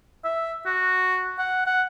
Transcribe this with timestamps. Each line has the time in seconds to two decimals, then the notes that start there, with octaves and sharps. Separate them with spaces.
0.24 E5
0.66 F#4
1.38 F#5
1.66 F#5